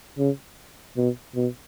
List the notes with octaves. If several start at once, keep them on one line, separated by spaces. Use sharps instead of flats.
C#3
B2
B2